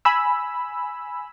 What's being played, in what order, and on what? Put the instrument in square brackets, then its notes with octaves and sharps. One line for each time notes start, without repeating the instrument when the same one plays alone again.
[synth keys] G#5 B5 E6